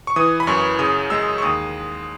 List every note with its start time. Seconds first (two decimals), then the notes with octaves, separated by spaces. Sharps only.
0.07 C#6
0.16 E3 D#6
0.40 B5
0.47 F#2 C#6
0.79 C#3 D#6
1.10 G#3 E6
1.38 C#6
1.42 D#2 D#6